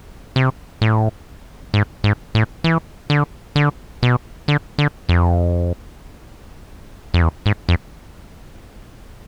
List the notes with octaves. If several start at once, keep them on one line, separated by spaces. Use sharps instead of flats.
C3
A2
G#2
G#2
A2
E3
D3
D3
B2
D3
D3
F2
F2
E2
G#2
F2